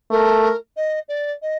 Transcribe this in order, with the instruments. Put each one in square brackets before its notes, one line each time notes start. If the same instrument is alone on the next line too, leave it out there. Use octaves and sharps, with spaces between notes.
[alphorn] A3 [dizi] A#4
[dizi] D#5
D5
D#5